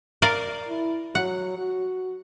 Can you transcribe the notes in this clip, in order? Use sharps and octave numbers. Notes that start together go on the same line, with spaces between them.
A#4 D5 F5
E4
F#3 F#5
F#4